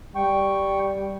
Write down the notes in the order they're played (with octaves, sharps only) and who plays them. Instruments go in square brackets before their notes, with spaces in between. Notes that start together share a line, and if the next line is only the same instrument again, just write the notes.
[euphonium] G3 [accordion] G5 C#6